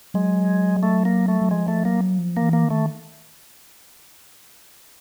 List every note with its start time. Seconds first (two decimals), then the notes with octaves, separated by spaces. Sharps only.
0.14 F#3 G#3
0.83 A3
1.05 A#3
1.28 A3
1.41 F#3
1.51 F3 G#3
1.68 A3
1.84 F#3 A#3
2.19 F3
2.37 A#3
2.42 E3
2.53 A#3
2.64 D#3
2.70 A3